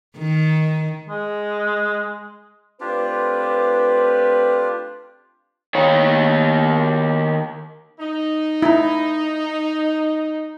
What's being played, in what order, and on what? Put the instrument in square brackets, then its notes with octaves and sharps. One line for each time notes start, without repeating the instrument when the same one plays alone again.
[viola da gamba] D#3
[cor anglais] G#3
[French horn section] A3 C4 B4 [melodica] D4 F4 G4
[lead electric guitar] D#3 C#5
[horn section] D#4
[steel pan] E4 A#5